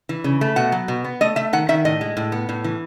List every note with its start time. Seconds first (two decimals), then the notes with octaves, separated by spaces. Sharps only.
0.09 E3
0.24 C#3
0.41 A3
0.56 B2 F#5
0.72 F#3
0.88 B2
1.04 B3
1.21 A3 D#5
1.36 A3 E5
1.53 D#3 F#5
1.69 D#3 E5
1.85 A2 D#5
2.01 G#3
2.17 A2
2.32 B3
2.49 A2
2.64 E3